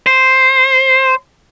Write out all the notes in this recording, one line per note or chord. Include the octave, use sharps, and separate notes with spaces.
C5